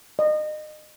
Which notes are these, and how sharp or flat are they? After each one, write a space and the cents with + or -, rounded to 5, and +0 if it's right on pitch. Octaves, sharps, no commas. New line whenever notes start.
D#5 -30